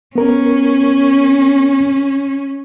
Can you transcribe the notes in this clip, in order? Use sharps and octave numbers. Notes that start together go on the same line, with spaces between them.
B3 C#4 A#4